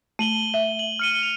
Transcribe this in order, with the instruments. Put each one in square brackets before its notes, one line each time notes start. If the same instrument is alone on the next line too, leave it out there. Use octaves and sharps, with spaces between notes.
[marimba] A3 [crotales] D#7 F#7 G7
[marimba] E5
[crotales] F#7
F6 C#7 D#7
F7